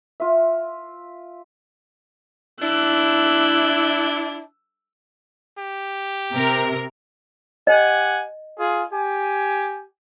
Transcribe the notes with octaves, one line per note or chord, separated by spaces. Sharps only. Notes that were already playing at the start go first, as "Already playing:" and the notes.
F4 E5
D4 E4 E6 F#6
G4
C3 A#4
G4 D#5 F#5 G#5
F4 G#4
G4 G#5